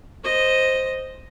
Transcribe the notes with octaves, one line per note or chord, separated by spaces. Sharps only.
C5 D#5